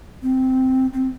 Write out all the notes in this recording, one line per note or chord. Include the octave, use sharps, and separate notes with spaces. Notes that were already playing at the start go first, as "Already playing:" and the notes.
C4
C4